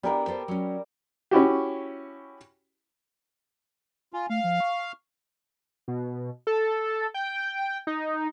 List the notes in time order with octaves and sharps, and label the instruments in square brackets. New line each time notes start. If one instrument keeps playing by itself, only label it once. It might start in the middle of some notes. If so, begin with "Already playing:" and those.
[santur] G3 A#4 G5 [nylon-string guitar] B3 D4 E4
[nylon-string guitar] B3 A4 C5
F#3 C#4
[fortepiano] C#4 E4 F#4 G4
[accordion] F4 [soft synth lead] G#5
[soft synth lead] A3 [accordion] F5
[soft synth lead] F3
C#6
[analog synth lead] B2
A4
G5
D#4